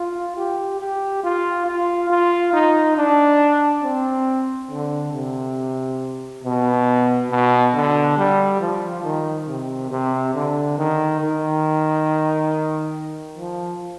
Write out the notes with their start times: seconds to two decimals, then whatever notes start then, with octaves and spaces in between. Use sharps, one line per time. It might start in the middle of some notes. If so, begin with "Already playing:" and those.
Already playing: F4
0.37 G4
0.80 G4
1.24 F4
1.67 F4
2.10 F4
2.53 D#4
2.97 D4
3.83 C4
4.71 D3
5.13 C3
6.44 B2
7.30 B2
7.75 D3
8.17 G3
8.61 F3
9.04 D#3
9.48 C3
9.91 C3
10.35 D3
10.78 D#3
11.21 D#3
13.38 F3